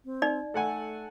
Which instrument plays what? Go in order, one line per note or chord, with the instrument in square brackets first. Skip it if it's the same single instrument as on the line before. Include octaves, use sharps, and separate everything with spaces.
[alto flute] C4
[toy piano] D#4 D5
[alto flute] A3 [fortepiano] A4 F#5 G#5